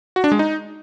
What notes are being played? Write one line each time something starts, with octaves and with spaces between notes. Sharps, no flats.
F#4
D4
G#3
D#4